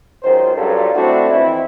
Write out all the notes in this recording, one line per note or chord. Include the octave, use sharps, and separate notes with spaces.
C#2 F#2 D#3 C5
C#2 G2 F#3 G3 F4 A4
A3 C4 D4 E4 F#4
F2 E3 C4 E4